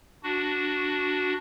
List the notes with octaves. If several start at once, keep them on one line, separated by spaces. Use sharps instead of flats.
D4 F#4